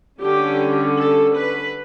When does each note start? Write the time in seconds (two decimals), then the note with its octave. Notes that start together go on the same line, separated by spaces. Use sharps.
0.21 D3 G3 C#4 G4
0.98 A4
1.37 B4